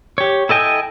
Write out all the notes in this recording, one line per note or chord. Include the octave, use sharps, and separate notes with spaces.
G4 C#5
E4 A4 D#5 G5 G#5